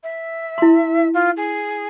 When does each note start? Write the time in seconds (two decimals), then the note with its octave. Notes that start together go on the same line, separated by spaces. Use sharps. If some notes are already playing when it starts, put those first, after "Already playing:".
0.03 E5
0.58 E4 C6
1.13 F4
1.36 G#4